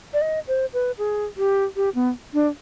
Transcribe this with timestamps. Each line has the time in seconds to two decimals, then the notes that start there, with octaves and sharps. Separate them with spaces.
0.13 D5
0.21 D#5
0.48 C5
0.73 B4
0.98 G#4
1.37 G4
1.76 G4
1.95 B3
2.34 D4